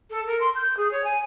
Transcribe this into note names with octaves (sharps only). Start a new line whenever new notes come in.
A4
A#4
C6
G6
G#4
C#5
G#5